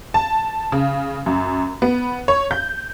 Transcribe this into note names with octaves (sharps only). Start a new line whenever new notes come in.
A5
C#3
F#2
B3
C#5
G6